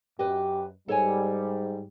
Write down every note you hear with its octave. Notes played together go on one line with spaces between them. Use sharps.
F#2 G4 B4 D#5
G#2 G3 A4 C#5 G#5